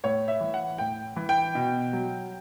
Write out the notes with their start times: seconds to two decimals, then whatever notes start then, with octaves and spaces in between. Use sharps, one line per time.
0.04 A2 C#5
0.28 E5
0.41 E3
0.54 F#5
0.78 A2 G5
1.16 E3
1.29 G5
1.55 B2
1.93 F#3